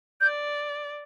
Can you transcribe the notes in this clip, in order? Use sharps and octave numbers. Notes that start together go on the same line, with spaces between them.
D5 G6